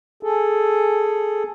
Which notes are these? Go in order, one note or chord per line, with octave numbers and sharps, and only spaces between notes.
G#4 A4